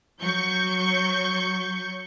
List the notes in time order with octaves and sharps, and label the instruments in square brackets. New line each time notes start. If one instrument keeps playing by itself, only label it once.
[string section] F#3 C#6 G6